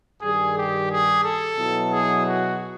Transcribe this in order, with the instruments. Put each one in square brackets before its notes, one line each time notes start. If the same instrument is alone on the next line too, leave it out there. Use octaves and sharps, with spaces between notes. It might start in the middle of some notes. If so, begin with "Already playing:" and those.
[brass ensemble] G2 D#3 G3 G#4
G4
G#4
A4
B2 F#3 B3 E4
G#4
F#4